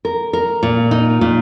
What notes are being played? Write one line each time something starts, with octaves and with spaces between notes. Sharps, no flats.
A#4
A#4
A#2
D#4
A#2